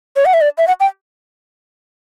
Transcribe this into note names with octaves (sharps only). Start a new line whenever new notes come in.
C#5
F#5
E5
D5
E5
F#5
G5